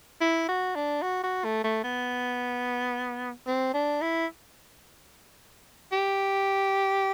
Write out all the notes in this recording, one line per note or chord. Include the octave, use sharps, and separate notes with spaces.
E4
F#4
D4
F#4
F#4
A3
A3
B3
C4
D4
E4
G4